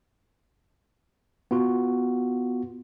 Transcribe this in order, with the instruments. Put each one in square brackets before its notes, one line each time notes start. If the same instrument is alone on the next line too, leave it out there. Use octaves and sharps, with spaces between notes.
[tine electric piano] B3 F4 F#4